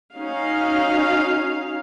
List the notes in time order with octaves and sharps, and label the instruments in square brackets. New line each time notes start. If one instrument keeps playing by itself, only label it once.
[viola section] C#4 D#4 F#4 F5